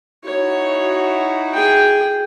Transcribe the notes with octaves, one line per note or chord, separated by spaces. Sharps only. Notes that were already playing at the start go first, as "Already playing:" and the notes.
D#4 E4 F#4 C#5
G#4 G5